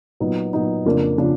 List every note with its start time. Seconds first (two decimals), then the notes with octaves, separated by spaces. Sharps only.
0.20 A#2 F#3 B3 D#4
0.53 A#2 F#3 B3 D#4
0.85 F2 C#3 F3 A#3 D4
1.18 C#3 F3 A#3 D4